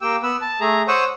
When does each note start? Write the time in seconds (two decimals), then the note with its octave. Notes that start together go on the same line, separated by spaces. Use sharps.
0.01 A#3 G4 G5 E6
0.23 B3 B4 E6
0.42 A5
0.61 A3 G#4 A#5
0.88 C5 C#5 F#5 C#6 D#6 E6